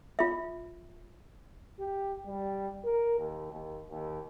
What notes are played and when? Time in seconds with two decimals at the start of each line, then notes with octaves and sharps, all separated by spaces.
0.19 F4 E5
1.79 G4
2.27 G3
2.84 A#4
3.19 D#2
3.52 D#2
3.90 D#2